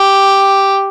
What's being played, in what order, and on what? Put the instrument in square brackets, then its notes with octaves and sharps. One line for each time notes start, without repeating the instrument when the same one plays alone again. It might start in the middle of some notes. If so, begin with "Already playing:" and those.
Already playing: [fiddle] G4